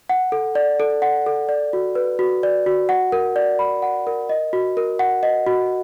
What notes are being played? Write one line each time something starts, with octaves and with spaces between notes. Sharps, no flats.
F#5
A4
D5
A4
F#5
A4
D5
F#4
B4
F#4
D5
F#4
F#5
A#4
D5
B5
F#5
A#4
D#5
F#4
A#4
F#5
D#5
F#4